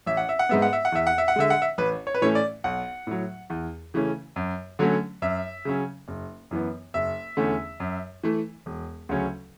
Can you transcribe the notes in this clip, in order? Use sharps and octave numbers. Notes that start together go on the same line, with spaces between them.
A1 E5
F#5
E5
F#5
G#2 G#3 B3 E5
F#5
E5
F#5
E2 E5
F#5
E5
F#5
D3 G#3 E5
F#5
E5
A1 B4
C#5
B4
A2 E3 A3 C#4 C#5
D5
B1 F#5
A2 F#3
E2
C#3 E3 A3 C#4
F#2
D3 F#3 A3 C#4
F#2 E5
C#3 F#3 C#4
F#1
F#2 E3 B3
F#1 E5
E2 D3 A3 C#4
F#2
E3 A3
E1
D2 C#3 F#3 C#4